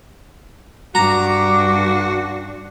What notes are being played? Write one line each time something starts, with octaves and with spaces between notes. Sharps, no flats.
G2 D4 F#4 A#5 D6